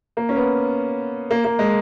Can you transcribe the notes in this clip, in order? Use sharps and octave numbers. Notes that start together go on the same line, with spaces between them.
A#3
C#4
B3
A#3
A#3
G#3